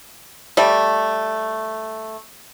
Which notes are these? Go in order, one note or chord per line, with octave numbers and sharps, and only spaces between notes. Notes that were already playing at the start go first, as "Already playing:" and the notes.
G3 A3